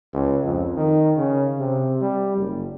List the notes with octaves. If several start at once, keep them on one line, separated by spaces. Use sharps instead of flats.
C#2
F2
D#3
C#3
C3
G3
F#1